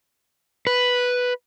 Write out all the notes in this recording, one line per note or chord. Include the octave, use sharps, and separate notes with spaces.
B4